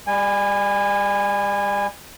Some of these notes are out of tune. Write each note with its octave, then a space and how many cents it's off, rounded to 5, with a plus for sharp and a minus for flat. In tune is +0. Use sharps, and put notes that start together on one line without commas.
G3 +30 G#5 -25